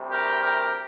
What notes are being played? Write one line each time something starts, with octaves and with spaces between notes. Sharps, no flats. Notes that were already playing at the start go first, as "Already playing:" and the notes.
Already playing: D2 C3 G3
G4 A#4
G4 A#4